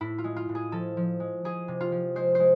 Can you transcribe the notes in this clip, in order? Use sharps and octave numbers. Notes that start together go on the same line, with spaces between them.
A2 E4
F4
G#3
F4
A2
G#4
F3 A4
F3
G#3
F3 G#4
C3
F4
F3
G#3 C5
G#3 C5